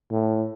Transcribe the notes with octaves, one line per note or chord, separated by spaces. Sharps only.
A2